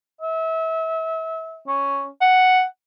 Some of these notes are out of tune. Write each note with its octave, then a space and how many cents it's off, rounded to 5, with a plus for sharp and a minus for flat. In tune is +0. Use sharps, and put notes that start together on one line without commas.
E5 -30
C#4 +0
F#5 +0